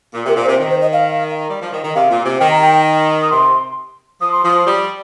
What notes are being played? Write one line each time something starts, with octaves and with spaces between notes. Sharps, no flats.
A#2
C3 A#4
A#2
C5
C3
D#3
C5
D#5
F5
G3
F3
D#3
D#3
C3 F5
A#2
C3
D#3 G5
A#5
G5
D#6
C3 C6
F3 D#6
C6
F3 D#6
G3